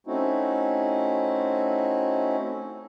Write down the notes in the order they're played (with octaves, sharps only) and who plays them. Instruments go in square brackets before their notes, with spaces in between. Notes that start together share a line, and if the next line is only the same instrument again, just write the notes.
[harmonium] A3 C4 C#4 D#4 E4 F#4